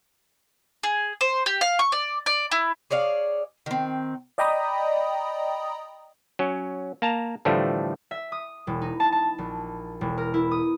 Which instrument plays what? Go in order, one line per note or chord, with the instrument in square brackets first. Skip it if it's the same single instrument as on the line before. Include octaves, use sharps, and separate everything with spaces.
[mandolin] G#4
C5
G4
F5
C#6
D5
D5
E4
[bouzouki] G#4 C#5 D5 F5
D#3 C4
[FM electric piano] D5 D#5 G5 A#5 B5 D#6
[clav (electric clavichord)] F#3 C#4
A#3 A5 A#5
A2 D3 E3 F3 G3 A3
[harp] E5
D#6
E1
D#4
A5
A5
A#1
E1
A#4
E4
D#6